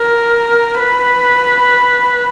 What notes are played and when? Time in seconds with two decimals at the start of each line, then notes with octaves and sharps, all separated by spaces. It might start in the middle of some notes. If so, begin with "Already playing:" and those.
Already playing: A#4
0.80 B4